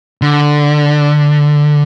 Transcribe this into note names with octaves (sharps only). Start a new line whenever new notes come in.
D3